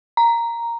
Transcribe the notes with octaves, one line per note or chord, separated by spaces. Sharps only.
A#5